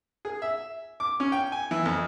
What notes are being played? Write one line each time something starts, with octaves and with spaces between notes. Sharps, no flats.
G#4
E5
D6
C#4
G5
G#5
E3
F2